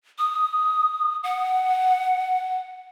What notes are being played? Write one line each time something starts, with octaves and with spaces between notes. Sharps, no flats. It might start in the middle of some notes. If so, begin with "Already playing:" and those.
D#6
F#5